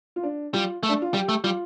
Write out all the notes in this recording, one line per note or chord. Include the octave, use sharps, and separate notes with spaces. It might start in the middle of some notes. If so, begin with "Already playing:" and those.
F4
D4
G3 F4
A3
D4
F4
G3 G4
A3
G3 F4